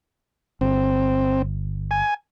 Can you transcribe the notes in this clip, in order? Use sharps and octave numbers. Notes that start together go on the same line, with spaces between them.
G1 C4
G#5